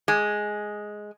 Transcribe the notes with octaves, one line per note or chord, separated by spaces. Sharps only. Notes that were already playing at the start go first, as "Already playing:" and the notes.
G#3